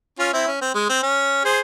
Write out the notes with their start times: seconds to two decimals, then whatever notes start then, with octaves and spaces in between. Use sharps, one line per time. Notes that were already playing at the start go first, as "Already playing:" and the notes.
0.19 C#4 F4
0.33 C4 E4
0.47 C#4
0.61 C4
0.75 G#3
0.89 C4
1.03 C#4
1.45 G#4 C5